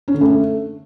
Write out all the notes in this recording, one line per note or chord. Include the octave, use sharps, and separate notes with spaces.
C#4
D3
A3